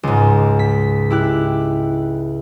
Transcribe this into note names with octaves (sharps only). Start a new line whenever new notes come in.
C#2 G#2
B6
E4 G4 F#6